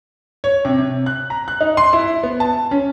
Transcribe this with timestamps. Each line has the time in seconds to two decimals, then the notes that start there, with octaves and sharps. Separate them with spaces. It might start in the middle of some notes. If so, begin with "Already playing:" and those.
0.44 C#5
0.65 C3
0.79 C3
1.06 F#6
1.30 A#5
1.48 F#6
1.61 D#4
1.77 C6
1.93 E4
2.23 B3
2.40 A5
2.71 C#4